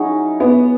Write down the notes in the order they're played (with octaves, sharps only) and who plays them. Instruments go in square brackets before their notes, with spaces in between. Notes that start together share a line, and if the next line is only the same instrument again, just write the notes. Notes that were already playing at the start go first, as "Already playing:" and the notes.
Already playing: [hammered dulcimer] F#3 C#4 E4 G#4 [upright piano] D#4
[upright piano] B3